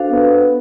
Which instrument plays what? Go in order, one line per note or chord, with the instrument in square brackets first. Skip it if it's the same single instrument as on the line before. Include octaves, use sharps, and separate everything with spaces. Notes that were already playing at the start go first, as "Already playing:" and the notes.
Already playing: [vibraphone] D4 F#4 A4 C5 F5
[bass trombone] B3